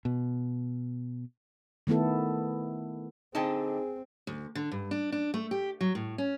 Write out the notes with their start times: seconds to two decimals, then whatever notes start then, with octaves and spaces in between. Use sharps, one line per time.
0.05 B2
1.87 D#3 A3 B3 E4 A4
3.35 D3 C4 D#4 G#4 D#5 G5 A5
4.27 D2
4.55 D3
4.72 G2
4.91 D4
5.12 D4
5.34 A3
5.51 G4
5.81 F#3
5.95 A2
6.18 C#4